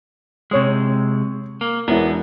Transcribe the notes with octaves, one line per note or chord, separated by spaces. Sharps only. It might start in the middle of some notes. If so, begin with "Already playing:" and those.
C3 G#3 C#5 D#6
A#3
E1 B3 D4 E4 A#4